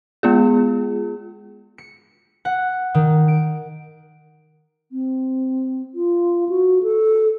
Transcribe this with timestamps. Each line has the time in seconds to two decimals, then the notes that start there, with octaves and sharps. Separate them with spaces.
0.23 G#3 B3 F4 G#4
1.78 C#7
2.45 F#5
2.94 D#3
3.28 D7
4.92 C4
5.95 F4
6.49 F#4
6.83 A4